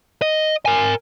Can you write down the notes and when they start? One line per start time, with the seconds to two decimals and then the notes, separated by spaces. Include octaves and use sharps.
0.22 D#5
0.66 A#4 G#5